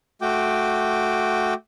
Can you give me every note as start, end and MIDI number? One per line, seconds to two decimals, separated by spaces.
0.21 1.54 57
0.21 1.54 66
0.21 1.54 79
0.21 1.54 86